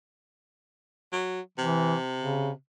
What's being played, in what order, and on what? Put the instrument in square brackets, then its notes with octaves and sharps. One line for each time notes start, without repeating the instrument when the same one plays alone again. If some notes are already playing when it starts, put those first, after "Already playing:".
[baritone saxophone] F#3
[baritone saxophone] C3 [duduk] E3
[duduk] C#3